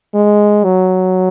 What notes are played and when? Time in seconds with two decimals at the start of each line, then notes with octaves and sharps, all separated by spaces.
0.14 G#3
0.64 F#3